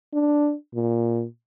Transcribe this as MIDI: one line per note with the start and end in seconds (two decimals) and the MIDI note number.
0.14 0.54 62
0.75 1.24 46